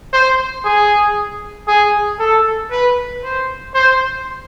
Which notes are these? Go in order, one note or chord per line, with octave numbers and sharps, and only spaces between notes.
C5
G#4
G#4
A4
B4
C5
C5